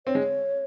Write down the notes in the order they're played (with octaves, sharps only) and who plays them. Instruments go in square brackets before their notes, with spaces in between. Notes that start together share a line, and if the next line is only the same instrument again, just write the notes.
[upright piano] C4 [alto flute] C#5
[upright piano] G#3